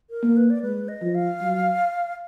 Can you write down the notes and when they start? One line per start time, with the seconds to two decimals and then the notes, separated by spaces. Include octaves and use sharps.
0.10 A#4
0.23 A#3
0.37 B4
0.50 D5
0.62 G#3 B4
0.88 D#5
1.02 F3
1.15 F5
1.41 F#3